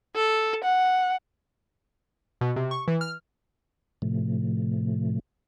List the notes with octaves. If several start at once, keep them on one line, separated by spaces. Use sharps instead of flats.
A4
F#5
B2
C3
C#6
E3
F6
A2 C3 F3 A3